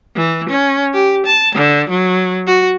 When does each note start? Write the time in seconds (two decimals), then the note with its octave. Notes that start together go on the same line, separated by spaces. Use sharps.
0.16 E3
0.49 C#4
0.94 G4
1.26 A5
1.55 D3
1.90 F#3
2.47 F#4